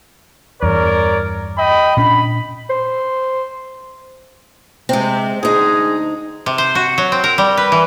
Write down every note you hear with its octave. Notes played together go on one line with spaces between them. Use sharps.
E2 G2 A#4 C#5 D5
D#5 G5 B5
A#2 C#4 D4 B5
C5
C3 G#3 C4
D2 G#3 D#4 G#4
C3
C5
F#4
F#3
C4
A#4
G3
B4
E3